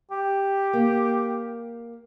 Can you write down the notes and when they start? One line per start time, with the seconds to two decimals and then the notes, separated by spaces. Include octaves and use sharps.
0.11 G4
0.73 A#3